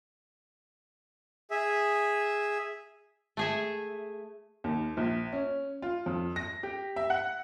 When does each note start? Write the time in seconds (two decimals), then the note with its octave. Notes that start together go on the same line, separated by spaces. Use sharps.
1.50 G#4 E5
3.37 A3 G#4 E5
4.64 D#2
4.97 A#1
5.33 C#4
5.82 F4
6.06 F2
6.36 A#6
6.63 G4
6.96 E5
7.10 F#5